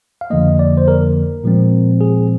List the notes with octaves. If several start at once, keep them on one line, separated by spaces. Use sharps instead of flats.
F5
F2 D3 F3 A#3 D#5
D5
C5
A#4
A#2 F3 G#3 C4
G#4